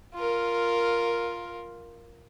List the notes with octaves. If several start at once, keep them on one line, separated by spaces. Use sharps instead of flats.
F4 A#4